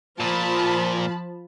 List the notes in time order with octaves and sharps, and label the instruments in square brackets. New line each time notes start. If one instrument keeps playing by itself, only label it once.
[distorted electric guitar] A#2 [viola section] F3 [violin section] A5 B5